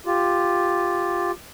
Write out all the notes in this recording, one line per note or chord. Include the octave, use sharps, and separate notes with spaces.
F4 G4